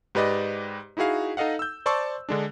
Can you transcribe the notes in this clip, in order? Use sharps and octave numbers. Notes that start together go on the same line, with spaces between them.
G#2 G4 B4 D5 D#5
D#4 E4 F#4 G#4 F5
D#4 A4 D#5 F5 F#5
E6 G6
C5 D5 A5 C6 C#6 E6
D3 G#3 D4